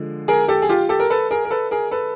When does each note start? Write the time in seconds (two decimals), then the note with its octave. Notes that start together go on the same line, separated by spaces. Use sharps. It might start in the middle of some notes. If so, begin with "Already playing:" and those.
Already playing: D3 F3 G#3
0.28 G#4 A#4
0.48 G4 A4
0.62 G#4
0.69 F4 G4
0.89 G4 A4
1.00 A#4
1.10 A4 B4
1.31 G#4 A#4
1.45 A#4
1.51 A4 B4
1.71 G#4 A#4
1.91 A4 B4